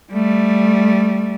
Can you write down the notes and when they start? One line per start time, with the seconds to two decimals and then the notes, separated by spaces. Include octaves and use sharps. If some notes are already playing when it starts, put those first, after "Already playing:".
0.13 G3 A3